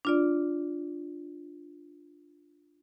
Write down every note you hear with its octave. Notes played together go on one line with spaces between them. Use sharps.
D4 F4 D5